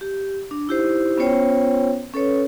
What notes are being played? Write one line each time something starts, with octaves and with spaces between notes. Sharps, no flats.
G4
D4
D#4 E4 G4 C5
B3 C#4 F4 C5 C#5 G5
C#4 A4 B4 C#5